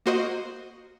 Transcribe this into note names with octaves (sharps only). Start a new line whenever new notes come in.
A#3 F#4 C5 D#5